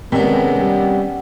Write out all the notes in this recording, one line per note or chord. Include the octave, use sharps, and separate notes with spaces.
C3 D#3 G#3 B3 C#4 D4
G3